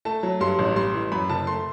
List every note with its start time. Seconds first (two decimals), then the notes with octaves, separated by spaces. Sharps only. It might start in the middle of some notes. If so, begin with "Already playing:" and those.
0.05 A3 A5
0.23 F#3
0.40 G2 C6
0.59 A1
0.76 G3 C6
0.94 E3
1.12 F#2 B5
1.29 F#1 A5
1.47 A3 C6